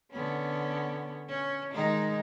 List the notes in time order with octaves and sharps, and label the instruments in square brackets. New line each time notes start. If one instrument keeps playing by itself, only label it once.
[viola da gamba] D3 B3 C#4
C#4
D#3 G#3 D#4